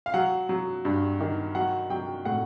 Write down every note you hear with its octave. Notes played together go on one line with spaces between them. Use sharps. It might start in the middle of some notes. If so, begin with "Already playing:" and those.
F5
F#3 F#5
F#3
G2
D#3
F#3 F#5
F#3 G5
A2 F#5